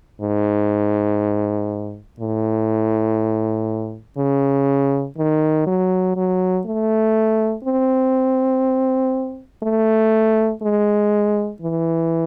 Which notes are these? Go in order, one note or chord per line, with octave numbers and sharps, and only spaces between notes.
G#2
A2
C#3
D#3
F#3
F#3
A3
C4
A3
G#3
E3